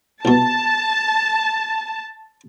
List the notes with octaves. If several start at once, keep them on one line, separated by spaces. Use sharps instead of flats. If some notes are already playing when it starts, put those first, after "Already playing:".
C2 B2 A5